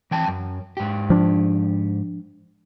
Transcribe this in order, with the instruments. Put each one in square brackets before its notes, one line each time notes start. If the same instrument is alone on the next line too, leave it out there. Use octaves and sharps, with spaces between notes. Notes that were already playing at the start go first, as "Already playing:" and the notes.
[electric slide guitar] E3 G5 A5
F#2
G#2 G4
[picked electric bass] F3 D4